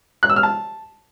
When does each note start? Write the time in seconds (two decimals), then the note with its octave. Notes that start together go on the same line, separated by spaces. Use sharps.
0.23 F#6
0.30 E6
0.36 F6
0.43 A5